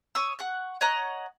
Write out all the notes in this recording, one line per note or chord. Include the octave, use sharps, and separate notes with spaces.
C#5 C#6 D#6 E6
F#5 C#6 F#6
C#5 D#5 F#5 A#5